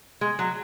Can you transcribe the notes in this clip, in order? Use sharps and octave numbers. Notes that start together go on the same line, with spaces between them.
G#3
F#3